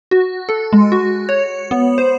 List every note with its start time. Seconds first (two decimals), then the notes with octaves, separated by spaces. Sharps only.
0.11 F#4
0.49 A4
0.73 G#3
0.92 F#4
1.29 C#5
1.71 B3
1.98 C5